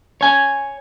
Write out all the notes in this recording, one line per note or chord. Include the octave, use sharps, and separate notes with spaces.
C#5 G#5